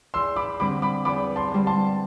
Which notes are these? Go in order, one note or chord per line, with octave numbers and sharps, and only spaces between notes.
E2 C6 E6
B5 D6
D3 G3 C4 B5 D6
B5 D6
E2 B5 D6
A5 C6
D3 G3 C4
A5 C6